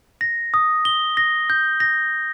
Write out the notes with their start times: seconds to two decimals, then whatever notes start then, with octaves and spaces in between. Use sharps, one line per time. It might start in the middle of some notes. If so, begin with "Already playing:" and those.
0.21 A#6
0.54 D#6
0.85 G7
1.17 A#6
1.50 G6
1.80 A#6